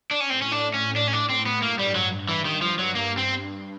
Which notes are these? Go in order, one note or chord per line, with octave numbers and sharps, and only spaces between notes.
D4
C#4
A2 C4
C#4
D4
C#4
D4
C#4
D4
C4
B3
G2 A#3
G3
F#3
E3
D#3
F3
F#3
A#3
C4